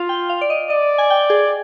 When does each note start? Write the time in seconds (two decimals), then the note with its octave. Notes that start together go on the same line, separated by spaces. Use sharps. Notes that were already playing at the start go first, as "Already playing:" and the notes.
Already playing: F4 F5
0.09 G5
0.29 F5
0.41 D5
0.50 D#5
0.70 D5 D#5
0.98 G#5
1.10 G5
1.30 G#4